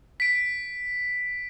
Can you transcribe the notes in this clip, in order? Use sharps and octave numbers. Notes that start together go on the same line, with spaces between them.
B6 D7